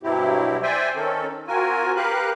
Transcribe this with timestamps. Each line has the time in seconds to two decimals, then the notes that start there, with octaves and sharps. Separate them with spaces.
0.03 G2 B2 F#3 C4 E4 G4
0.62 C5 D5 E5 G5 G#5
0.95 D#3 C4 C#4 A4
1.48 C4 F4 F#4 A#4 G#5
1.96 G4 A#4 B4 F5 F#6